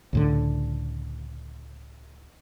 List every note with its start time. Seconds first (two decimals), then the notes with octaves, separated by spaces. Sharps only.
0.13 C#2 A2 D3